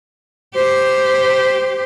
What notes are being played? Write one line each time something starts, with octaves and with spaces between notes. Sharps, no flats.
G4 C5